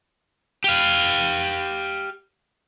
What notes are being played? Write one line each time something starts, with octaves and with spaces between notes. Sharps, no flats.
G4 F5